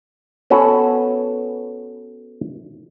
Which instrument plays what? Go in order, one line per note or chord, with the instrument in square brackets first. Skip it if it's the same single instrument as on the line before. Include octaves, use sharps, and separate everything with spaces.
[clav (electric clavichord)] B3 C#4 F#4 A4 B4